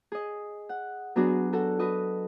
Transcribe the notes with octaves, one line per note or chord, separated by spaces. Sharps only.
G#4 D#5
F#5
F#3 B3 D4 F#4 G#4
F#4 A4 F#5
F#4 B4 D#5